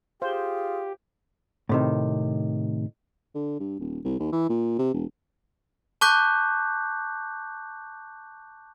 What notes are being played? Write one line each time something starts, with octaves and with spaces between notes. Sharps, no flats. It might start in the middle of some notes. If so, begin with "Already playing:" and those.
F4 G4 G#4 C5
A2 C3 D#3
D3
G2
D#1
C2
D#2
E3
A#2
C3
E1
A5 C#6 D6 F#6 G6 B6